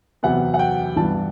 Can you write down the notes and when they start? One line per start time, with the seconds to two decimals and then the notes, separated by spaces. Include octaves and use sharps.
0.23 E2 C3 F#3 B3 F#5
0.54 F#5
0.59 G5
0.96 G2 E3 B3 A5